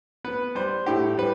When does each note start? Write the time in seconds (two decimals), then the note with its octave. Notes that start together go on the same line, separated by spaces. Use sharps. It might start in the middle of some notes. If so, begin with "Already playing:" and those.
0.24 B3 B4
0.55 G3 C5
0.86 A2 G4
1.17 G3 B4